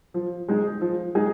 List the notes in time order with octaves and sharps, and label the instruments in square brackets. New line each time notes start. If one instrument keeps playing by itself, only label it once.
[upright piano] F3
G#3 D#4 G#4
F3
G#3 D#4 G#4